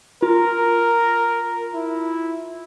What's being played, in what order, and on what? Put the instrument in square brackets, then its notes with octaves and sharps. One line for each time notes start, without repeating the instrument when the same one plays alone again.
[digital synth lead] F4 [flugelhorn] A#4
[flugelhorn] E4